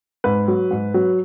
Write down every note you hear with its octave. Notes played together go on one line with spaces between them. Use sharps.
G#2 B4
F#3
G#2
F#3